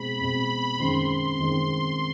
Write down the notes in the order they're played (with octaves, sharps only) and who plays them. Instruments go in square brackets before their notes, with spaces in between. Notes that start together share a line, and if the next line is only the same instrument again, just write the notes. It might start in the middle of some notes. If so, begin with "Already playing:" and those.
Already playing: [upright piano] B2 G#3 C4 [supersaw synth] B5
[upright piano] B2 G#3 C4
[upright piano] F#2 D#3 G#3 C4 [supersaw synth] C6
[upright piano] F#2 D#3 G#3 C4